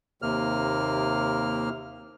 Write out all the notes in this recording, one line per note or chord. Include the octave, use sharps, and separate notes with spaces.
D#2 C3 A#3 F6